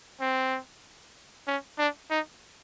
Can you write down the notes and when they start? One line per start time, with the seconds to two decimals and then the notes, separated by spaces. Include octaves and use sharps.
0.21 C4
1.47 C#4
1.78 D4
2.10 D#4